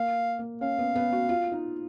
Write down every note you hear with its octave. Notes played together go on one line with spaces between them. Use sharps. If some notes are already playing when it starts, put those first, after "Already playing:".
Already playing: A#3 F5
A#3
C#4 F5
B3
B3
F#4
F4
D#4